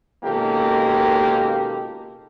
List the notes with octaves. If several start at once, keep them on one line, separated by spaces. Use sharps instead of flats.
C#2 B2 D#3 A#3 G4 A4